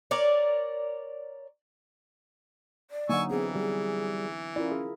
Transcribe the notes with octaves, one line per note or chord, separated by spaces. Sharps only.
A#4 C#5 D5
D5
D3 F#3 A#3 D#4 F#5 G#5 C#6 E6
E3 B3 C4 G#4
G3 G#4
C#4 E4 F4 A#4 D5
G#4